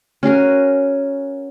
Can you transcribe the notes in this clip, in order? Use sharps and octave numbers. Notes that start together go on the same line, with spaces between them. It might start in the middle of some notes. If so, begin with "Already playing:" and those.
C#4 F#4 G#4 A#4